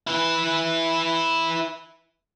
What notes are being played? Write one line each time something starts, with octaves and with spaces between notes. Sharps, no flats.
E4 B4